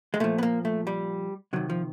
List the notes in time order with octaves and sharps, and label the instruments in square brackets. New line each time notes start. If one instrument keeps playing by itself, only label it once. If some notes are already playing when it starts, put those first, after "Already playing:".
[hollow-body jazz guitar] G#3
A#2 F3 A3
B3
A#3
A3
G3
C3 D#3 F#3
F3